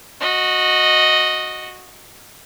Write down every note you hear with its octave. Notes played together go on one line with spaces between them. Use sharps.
F#4 D#5